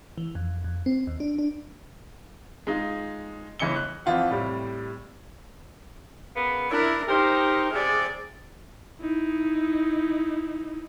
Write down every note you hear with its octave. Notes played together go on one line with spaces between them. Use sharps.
E3
F2
F2
C4
D#2
D4
D4
G#3 D#4 F4
G1 C#2 E3 D#5 C#7 G7
F#6
F2 E3 F3 F4 F#5
A2 C3 G3
C#3 A#3 B3
D4 E4 A#4
D#4 G4 A#4 C5
C3 G#4 D5
D#4 E4